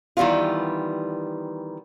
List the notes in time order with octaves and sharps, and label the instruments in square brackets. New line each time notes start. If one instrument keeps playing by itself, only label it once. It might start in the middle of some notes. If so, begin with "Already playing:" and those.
[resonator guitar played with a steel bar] D#3 E3 G3 B3 F4